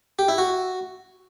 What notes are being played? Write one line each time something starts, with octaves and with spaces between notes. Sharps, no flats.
G4
E4
F#4